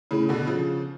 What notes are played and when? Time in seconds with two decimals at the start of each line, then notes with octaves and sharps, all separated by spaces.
0.11 A2 C#3
0.29 B2 D3
0.47 C#3 F3